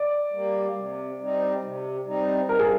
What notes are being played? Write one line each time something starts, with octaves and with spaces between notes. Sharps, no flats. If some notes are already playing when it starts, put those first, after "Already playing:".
Already playing: D5
G3 A#3
C3
G3 C4 D#4
C3
G3 C4 D#4
G2 A#4
G#4